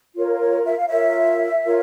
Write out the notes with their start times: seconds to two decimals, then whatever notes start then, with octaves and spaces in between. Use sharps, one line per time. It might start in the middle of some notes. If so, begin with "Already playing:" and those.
0.15 F4 A#4 C#5
0.40 C#5
0.66 E5
0.77 F5
0.88 F4 A#4 C#5 E5
1.64 F4 A#4 C#5